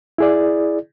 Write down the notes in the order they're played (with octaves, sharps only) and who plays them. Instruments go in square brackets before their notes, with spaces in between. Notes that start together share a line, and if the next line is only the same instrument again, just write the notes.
[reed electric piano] E4 G#4 D5